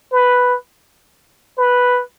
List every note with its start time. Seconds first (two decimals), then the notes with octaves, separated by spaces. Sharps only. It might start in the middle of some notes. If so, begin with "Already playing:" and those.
0.12 B4
1.58 B4